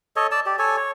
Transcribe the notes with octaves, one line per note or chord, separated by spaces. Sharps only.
A4 C#5 D#5
D5 A5 E6
G4 D5
A4 C#5 G#5
C#5